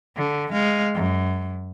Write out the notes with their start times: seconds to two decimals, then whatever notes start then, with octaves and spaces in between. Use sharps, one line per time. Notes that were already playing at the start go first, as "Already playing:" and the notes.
0.17 D3
0.52 G#3 F5
0.94 F#2